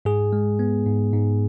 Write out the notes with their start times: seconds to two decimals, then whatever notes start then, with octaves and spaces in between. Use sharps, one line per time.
0.05 G#2 G#4
0.33 G#3
0.59 B3
0.86 G#2
1.13 G#2